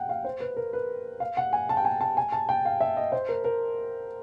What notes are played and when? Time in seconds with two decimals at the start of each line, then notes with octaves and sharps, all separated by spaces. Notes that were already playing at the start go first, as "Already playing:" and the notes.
Already playing: F#5 G5
0.09 F5
0.25 C5
0.40 B4
0.57 A#4
0.73 B4
1.20 F5
1.37 F#5
1.53 G#5
1.69 A5
1.77 G5
1.85 G#5
2.01 A5
2.17 G#5
2.32 A5
2.49 G5
2.65 F5
2.81 E5
2.97 D#5
3.12 C5
3.29 A#4
3.44 A#4